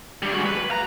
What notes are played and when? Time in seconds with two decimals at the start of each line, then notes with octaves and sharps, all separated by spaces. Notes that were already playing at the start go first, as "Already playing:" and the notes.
0.22 G3 D4
0.34 G#3 F#4
0.46 B4
0.71 A#5